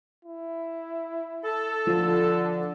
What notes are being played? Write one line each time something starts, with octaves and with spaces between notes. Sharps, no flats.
E4
A4
D3 F3